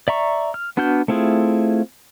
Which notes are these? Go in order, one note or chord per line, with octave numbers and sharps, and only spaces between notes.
D5 E5 A#5 C#6
F6
B3 D4 F#4 F6 G6
A3 C4 E4 F4 G#4